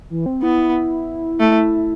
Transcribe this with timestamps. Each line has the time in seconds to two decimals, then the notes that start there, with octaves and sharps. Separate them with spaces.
0.10 E3
0.26 C4
0.43 B3 E4
1.40 A3